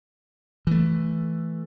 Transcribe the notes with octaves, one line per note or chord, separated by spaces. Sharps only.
E3 A3